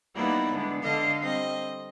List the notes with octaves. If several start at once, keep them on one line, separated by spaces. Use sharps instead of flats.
G3 A#3 B3 D#4 E4 D5
D3 G#3 B3 D4
D3 A4 D#5 F5
G3 C4 D#5